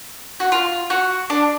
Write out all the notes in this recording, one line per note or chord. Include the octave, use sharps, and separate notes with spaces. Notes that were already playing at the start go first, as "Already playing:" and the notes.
F#4
F4
F#4
D4